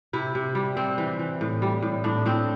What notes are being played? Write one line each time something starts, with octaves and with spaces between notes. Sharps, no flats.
C3 E4
C3
G3
C3 C4
E3
E3
A2
G3
A2
A2 D4
A2 C4